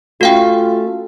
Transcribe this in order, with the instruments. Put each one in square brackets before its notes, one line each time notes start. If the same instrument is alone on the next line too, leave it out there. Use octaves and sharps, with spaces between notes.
[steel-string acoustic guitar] A3 C#4 [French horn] F4 [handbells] F#4 F5 G5